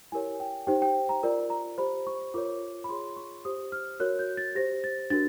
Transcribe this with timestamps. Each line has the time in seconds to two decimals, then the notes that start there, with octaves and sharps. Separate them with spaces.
0.12 E4 G4 A#4 C#5 G#5
0.40 G5
0.67 D#4 G4 C5 G5
0.82 G5
1.09 A#5
1.23 F4 A#4 D5
1.50 A#5
1.78 G4 C5 B5
2.07 C#6
2.34 F4 A#4 C#5 D6
2.84 B5
2.89 F4 G#4 C#5 C6
3.17 C#6
3.45 G4 C5 D#6
3.72 F6
4.00 F#4 A#4 C#5 F#6
4.19 G6
4.37 A6
4.55 G4 C5 A#6
4.84 A6
5.10 D4 F#4 A#4 A6